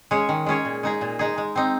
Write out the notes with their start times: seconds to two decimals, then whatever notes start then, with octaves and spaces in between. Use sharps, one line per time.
0.11 G#3 C#4 G#4 C#5
0.29 D#3
0.46 G#3 C#4 G#4 C#5
0.65 A#2
0.83 G#3 D#4 G#4
1.01 A#2
1.19 G#3 D#4 G#4
1.38 G#3
1.56 C4 D#4